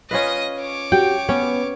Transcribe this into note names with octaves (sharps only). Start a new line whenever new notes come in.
C#4 F4 B4 D#5 D#6
C#5 D6
F#4 G4 G5
B3 C#4